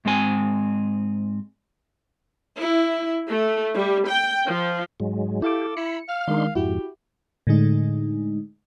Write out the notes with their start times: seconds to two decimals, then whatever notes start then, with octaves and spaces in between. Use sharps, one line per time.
0.05 G#2 G#3 C4 G#5
2.57 E4
3.26 A3
3.75 G3
4.08 G5
4.46 F3
5.00 G#2 F#3 G#3
5.42 E4 G4 A4 F5 D6
5.77 E4 B5 C#7
6.09 F5 F6
6.28 D#3 G#3 D4 D#4 A#4 C6
6.55 F2 G#2 E4 F#4 G4
7.47 A2 D3 G#3 D#4